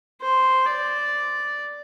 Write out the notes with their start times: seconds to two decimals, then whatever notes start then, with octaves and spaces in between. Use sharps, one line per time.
0.21 C5
0.66 D5